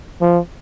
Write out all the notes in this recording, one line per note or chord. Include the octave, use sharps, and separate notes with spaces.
F3